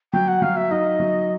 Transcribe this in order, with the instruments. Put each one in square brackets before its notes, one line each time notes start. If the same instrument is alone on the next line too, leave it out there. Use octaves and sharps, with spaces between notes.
[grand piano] F#3 [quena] G5
[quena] F#5
[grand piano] F#3 [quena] F5
[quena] E5
[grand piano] D#4 [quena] D#5
[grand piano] F#3